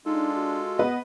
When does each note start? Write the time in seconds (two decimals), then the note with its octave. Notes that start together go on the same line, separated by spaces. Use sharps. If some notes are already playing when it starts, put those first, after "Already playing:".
0.06 G#3 D4 D#4 F4 A4
0.35 F#4
0.79 B3 B4 D#5